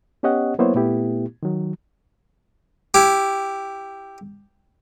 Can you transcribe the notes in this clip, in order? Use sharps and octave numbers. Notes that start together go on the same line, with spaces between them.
B3 C#4 G4 C#5 D#5 F#5
F#3 A#3 B3 E4 C5 C#5
A#2 A3 B3 E4 G4
D#3 F#3
E4 G4